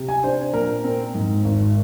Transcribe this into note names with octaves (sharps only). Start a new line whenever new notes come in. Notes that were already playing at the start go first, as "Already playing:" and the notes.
Already playing: C3
G#5
D4 C5
A#2 A#4
C4
G#2
G#1